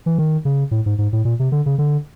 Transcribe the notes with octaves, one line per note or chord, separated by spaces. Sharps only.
E3
D#3
C#3
A2
G#2
G#2
A2
A#2
C3
D3
C#3
D3